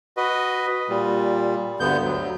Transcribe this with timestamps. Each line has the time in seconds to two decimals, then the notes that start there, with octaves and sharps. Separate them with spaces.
0.17 F#4 B4 D#5
0.88 A#2 G3
1.80 D2 G2 D3 B3 G6
2.04 D2 F#3